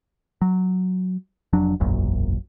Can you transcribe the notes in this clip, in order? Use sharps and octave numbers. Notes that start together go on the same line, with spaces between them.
F#3
F1 F2 F#3 D4
E1 A#1 F#2 A#2